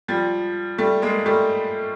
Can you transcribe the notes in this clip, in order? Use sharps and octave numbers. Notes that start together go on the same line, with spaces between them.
F3 G3
G3 A3
G#3 A#3
G3 A3